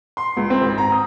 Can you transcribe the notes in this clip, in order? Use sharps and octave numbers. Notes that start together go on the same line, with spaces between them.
C6
C#2
C4
G#1
A#5
D#6